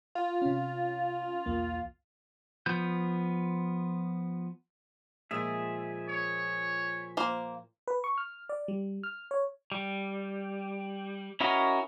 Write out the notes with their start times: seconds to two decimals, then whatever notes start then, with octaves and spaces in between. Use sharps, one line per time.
0.15 F4
0.42 C3 C#4
1.46 B1 E2 A#3
2.66 F3 B3 G6
5.31 A#2 F3 G#3 G#4 E5
6.09 C#5
7.17 A#3 C5
7.88 B4
8.04 C#6
8.18 F6
8.49 D5
8.68 G3
9.03 F6
9.31 C#5
9.72 G3
11.40 C#4 E4 F#4 A#4 D#5